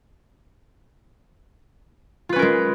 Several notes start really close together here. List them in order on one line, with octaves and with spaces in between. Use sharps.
F4 B4 C#4 A#4 G#3